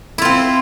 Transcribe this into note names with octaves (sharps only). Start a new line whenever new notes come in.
C4 E4 F4